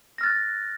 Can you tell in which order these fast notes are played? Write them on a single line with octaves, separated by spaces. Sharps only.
A#6 F6 A6 F#6